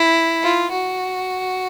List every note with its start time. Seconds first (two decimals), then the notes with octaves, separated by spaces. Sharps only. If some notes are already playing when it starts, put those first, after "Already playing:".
Already playing: E4
0.43 F4
0.72 F#4